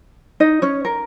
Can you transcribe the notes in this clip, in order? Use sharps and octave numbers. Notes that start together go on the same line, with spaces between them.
D#4 D#5
C#4 C#5
A#4